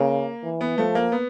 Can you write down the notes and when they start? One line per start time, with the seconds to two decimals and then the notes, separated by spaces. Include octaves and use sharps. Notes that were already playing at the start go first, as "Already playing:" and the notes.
Already playing: C#3 A#3
0.43 E3
0.61 B3
0.78 F3 A3
0.95 A#3
1.12 B3